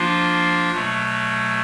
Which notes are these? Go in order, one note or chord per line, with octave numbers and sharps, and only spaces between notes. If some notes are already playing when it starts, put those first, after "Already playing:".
Already playing: F3 A#3 D4 F4
B2 F#3 A3